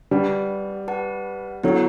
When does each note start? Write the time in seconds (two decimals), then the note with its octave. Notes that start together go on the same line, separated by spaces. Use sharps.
0.11 G3 G4 B4 F#5 A5
0.88 G4 B4 F#5 A5
1.63 F#3 B3 E4 A4 C#5 F#5